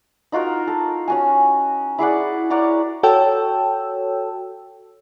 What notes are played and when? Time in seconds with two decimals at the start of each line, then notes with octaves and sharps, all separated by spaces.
0.32 D#4 F4 F#4 A#4
0.67 A4
1.08 C#4 F#4 G#5
1.98 E4 G#4 D5 F#5
2.50 A#4 C#5 D5 F#5
3.03 F#4 A4 C#5 G5 A5 E6